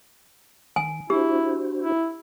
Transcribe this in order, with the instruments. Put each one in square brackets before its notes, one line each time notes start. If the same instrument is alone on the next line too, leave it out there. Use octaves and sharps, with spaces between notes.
[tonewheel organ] D#3 [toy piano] G#5
[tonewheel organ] D4 F#4 C5 [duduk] E4 [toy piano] G4
[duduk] E4